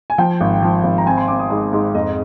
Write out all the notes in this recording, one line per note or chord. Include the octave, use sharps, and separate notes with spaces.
G#5
F3 G5
G#1
F3
G#1
A#5
C4 G#5
C6
C4 D6
D#6
G#2 D#6
G#2
F2 D#5